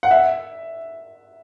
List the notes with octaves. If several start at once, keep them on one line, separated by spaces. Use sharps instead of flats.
F#5
E5